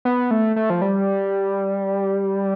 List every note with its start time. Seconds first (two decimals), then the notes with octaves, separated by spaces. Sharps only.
0.05 B3
0.31 A3
0.56 A3
0.70 F3
0.82 G3